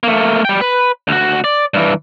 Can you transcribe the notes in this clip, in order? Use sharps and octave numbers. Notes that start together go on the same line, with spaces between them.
A3 A#3
G3 G5
B4
D2 F#4
D5
G2 E3